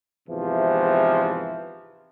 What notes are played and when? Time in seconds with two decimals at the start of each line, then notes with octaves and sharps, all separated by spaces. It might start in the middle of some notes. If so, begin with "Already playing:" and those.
0.29 E2 G#2 C3 E3 F3